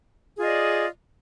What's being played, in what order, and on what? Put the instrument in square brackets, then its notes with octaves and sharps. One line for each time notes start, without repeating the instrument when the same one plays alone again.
[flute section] G#4
F4
D#5
D5